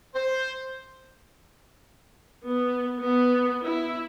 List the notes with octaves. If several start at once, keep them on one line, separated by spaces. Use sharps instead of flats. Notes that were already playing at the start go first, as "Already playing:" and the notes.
C5
B3
B3
E4